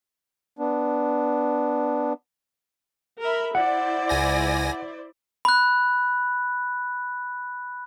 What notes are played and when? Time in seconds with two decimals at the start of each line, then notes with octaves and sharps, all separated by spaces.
0.59 B3 D4
3.21 A#4 E5 B5
3.55 E4 C5 D5 F#5
4.09 C#2 G#5 A#6
5.45 B5 F#6